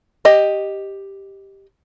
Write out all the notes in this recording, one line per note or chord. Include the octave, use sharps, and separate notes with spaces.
G4 D#5